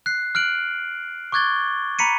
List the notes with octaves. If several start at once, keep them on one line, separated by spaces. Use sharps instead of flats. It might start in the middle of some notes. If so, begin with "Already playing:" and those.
F#6 C7
F6 F#6 D7 F#7
C#6 D6 F#6 G#6 A6 G7
A#5 B5 B6 C#7 D#7